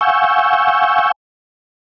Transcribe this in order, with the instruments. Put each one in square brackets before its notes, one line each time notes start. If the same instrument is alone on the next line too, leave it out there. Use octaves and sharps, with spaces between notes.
[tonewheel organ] F5 F#5 G#5 C#6 E6 G6